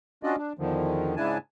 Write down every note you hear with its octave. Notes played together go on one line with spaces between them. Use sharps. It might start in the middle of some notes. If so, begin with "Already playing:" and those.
C#4 D4 F4 F#4 D5 D#5
D4
E2 D3 D#3 F3
G#2 C#3 D4 E4 G#5 A5